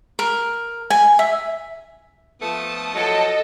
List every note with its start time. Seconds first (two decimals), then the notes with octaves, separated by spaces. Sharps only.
0.19 A#4
0.90 G#5
1.19 E5
2.41 F3 A3 B3 A5 D#6
2.95 F3 F#3 A4 D#5